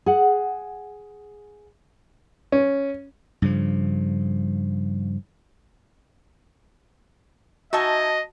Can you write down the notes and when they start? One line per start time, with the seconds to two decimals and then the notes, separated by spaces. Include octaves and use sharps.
0.06 G#4 F#5
2.52 C#4
3.42 G2 C#3 F3
7.73 D#4 F#4 D#5 E5 G#5 A5